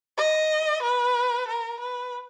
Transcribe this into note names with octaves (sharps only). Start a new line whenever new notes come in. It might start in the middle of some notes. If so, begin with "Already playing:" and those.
D#5
B4
A#4
B4